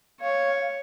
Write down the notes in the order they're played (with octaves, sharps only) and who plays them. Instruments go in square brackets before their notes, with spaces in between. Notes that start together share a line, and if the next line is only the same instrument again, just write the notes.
[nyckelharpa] C#5 [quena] F5